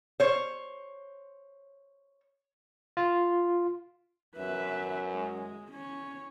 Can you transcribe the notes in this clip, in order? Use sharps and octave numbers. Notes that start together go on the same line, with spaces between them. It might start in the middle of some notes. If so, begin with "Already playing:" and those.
C5 C#5
F4
F#2 B4 E5
G#3
C#4 C#5